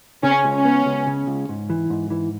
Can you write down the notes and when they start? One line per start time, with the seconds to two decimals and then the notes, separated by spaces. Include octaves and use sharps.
0.23 C#3 C#4
0.44 C#2
0.54 C#4
0.65 B3
0.86 C#2
1.07 C#3
1.27 C#2
1.49 G#2
1.70 E3
1.90 G#2
2.10 E3